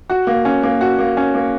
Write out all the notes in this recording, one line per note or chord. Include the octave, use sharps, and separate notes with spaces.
F#4
A#3
C#4
A#3
F#4
A#3
C#4
A#3